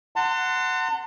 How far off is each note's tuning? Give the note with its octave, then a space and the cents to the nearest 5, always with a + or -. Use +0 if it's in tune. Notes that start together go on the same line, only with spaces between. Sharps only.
F#5 +0 A5 +45 C6 -20